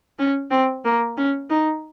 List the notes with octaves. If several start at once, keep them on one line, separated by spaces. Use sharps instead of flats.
C#4
C4
A#3
C#4
D#4